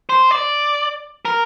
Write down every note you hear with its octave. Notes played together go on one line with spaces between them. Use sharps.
C5
D5
A#4